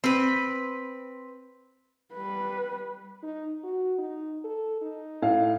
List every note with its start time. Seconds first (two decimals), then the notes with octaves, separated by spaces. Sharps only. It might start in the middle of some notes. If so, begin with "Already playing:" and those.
0.04 C4 B4
2.14 G3 B4
3.23 D#4
3.63 F#4
3.99 D#4
4.45 A4
4.82 D#4
5.22 A2 F5